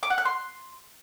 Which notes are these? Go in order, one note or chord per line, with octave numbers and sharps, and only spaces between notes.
D6
F#5
F#6
C6